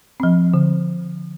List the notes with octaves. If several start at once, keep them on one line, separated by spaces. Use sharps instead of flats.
F3 C4
D3